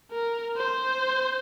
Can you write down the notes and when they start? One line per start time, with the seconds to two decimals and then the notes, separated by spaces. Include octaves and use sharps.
0.12 A#4
0.56 C5